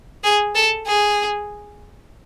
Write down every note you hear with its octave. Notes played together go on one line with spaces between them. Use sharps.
G#4
A4
G#4